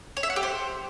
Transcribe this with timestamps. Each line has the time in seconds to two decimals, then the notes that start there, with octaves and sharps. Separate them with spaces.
0.17 C#5
0.23 E5
0.30 F#5
0.36 G4
0.43 C5